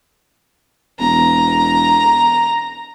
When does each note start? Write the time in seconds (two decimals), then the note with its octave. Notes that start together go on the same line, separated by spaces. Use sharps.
1.00 E1 A#5